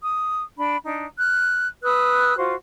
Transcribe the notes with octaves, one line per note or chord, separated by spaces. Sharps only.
D#6
D4 B5
D4 D#4
F6 F#6
B4 D#6 E6 F#6
F4 F#4 C5